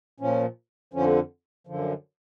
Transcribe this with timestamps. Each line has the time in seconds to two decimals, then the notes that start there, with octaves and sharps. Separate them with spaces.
0.20 A#2 F3 C#4
0.94 F2 D3 F3 C#4
1.67 F#2 D3 F3